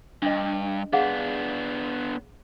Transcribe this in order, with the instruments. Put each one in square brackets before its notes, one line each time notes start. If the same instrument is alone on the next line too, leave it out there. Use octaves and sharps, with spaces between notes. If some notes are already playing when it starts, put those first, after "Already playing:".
[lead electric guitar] G2 [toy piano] D4 D#5
[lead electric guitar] B3 D4 [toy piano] G#4 F5 F#5